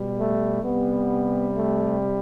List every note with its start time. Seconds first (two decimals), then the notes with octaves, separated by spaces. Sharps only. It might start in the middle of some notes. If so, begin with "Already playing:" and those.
Already playing: B2 G3
0.17 A3
0.63 C3 G3 B3
1.55 A3